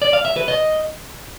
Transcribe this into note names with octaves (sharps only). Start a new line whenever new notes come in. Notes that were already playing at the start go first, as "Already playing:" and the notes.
D5
F5
E5
B4
D#5